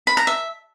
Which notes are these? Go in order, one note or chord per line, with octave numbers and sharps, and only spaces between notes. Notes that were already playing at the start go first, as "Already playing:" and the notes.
B5
A#5
E5